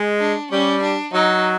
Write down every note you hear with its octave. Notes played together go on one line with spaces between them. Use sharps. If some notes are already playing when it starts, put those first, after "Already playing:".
Already playing: G#3
D4
G3 C#4
D4
F#3 D#4